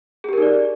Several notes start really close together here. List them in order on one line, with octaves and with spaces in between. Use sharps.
G#4 G4 A#4 D#4 D5